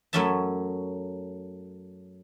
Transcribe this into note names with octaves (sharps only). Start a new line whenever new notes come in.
F#2 F#3 A3 C#4 E5 A5